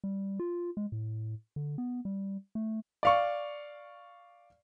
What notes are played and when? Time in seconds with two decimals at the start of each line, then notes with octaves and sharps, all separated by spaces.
0.04 G3
0.39 F4
0.77 G#3
0.92 A2
1.56 D3
1.78 B3
2.05 G3
2.55 A3
3.03 D5 F5 C#6